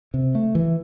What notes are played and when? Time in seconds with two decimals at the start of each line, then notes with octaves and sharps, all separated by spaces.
0.14 C3
0.35 A3
0.55 E3